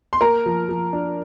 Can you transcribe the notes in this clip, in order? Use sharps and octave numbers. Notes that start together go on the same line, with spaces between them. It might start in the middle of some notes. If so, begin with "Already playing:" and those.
C6
A#3 A#4 A#5
F3
F3
D4